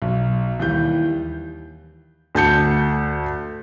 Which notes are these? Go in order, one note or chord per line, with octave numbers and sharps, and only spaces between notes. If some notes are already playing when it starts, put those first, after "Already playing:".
B1
D#2 E3 G3 G6
D2 A5 G6 C#7